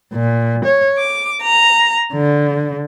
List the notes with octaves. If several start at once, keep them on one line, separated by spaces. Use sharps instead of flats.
A#2
C#5
D6
A#5
D3